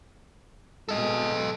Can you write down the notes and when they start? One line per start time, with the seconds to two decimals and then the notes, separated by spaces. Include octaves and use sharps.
0.89 B2 G#3 A4 D#5